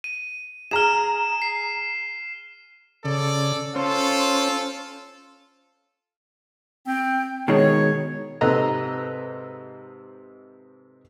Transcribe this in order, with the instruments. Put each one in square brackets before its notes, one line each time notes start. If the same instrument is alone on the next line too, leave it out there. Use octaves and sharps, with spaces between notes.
[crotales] D#7
[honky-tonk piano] G#4 A#5 [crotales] F6 E7
[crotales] C7
[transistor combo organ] C#3 [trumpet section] A4 D5
[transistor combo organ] C#4 C5 [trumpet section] F4 A4
[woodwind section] C4 G5
[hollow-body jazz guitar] B2 D#3 G#3 [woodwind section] C#5
[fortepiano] G#2 C3 A4 B4 D#5 A#5